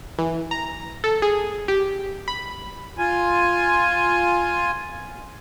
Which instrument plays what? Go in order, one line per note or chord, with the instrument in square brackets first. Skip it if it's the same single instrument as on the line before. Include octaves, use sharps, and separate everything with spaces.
[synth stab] E3
A#5
A4
G#4
G4
B5
[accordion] F4 G#5